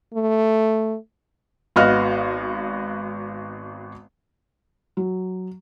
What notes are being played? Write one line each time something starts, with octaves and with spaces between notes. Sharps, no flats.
A3
G#1 B3 F#4 D#5 F5 F6
F#3